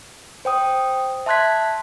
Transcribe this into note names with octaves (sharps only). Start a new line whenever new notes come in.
C5 G5 D#6
E5 A5 C6 F#6 G#6 B6